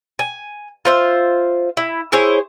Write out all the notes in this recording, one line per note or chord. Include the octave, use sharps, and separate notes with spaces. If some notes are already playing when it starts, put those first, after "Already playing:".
G#5
F4 C5 E5
E4
E4 G#4 C5 C#5